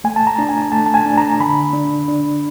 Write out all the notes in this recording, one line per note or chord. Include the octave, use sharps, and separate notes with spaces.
A3 G#5
A5
A#5
D4
G#5
A3 A5
A5
G#5
D4
A#5
D3 B5
D4
D4